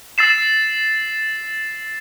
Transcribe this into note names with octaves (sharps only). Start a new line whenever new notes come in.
E6 A6 C7 E7